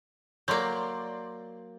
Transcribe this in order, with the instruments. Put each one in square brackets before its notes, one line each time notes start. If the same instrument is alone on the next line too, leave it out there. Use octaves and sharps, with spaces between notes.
[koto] F#3 A#3 [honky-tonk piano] D5 C6 G6